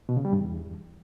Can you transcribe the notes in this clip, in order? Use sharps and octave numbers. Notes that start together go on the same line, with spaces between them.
B2
C#3
G3
G2
E2